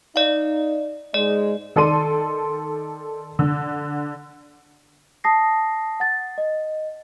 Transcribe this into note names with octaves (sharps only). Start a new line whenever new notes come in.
D#4 D5 F5
G#2 G#3 D5
D#3 A4 D5 C6 D#7
D3
A5 D#6 A#6 C7
F#5 A6
D#5